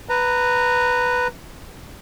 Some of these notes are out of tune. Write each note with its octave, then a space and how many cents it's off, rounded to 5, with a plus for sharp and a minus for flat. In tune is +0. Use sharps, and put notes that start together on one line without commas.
B4 +0 A#5 -15